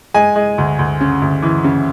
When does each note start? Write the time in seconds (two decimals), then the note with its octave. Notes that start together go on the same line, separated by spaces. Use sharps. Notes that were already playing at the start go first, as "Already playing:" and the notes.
0.14 G#3 G#5
0.36 G#3
0.58 D2
0.79 D2
1.01 C#3
1.22 D2
1.42 E3
1.64 C#3